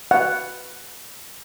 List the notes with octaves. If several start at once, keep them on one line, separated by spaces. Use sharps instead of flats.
F#5